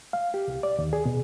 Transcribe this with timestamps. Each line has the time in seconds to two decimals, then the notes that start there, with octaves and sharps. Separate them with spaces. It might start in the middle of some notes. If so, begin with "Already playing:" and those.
0.13 F5
0.34 G4
0.48 C2
0.63 D5
0.79 D#2
0.93 G#4
1.05 B2